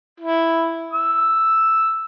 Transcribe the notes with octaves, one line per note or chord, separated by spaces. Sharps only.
E4
E6